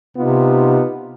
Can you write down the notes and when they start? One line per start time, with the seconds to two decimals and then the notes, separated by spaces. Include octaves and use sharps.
0.17 C3 B3 D#4 F4